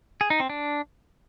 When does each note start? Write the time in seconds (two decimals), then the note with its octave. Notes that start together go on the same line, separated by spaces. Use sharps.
0.21 G#4
0.30 D#4
0.40 C4
0.50 D4